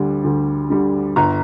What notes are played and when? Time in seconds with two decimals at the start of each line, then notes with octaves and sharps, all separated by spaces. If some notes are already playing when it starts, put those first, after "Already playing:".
Already playing: D2 D3 G3
0.24 D2
0.70 D3 G3
1.16 G1 A#5